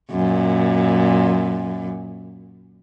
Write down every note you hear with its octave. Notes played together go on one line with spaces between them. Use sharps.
F#2 A#2